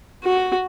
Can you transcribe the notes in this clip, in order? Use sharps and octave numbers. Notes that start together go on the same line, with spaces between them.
F#4